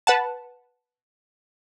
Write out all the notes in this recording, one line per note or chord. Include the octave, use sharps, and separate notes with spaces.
B4 F#5 A5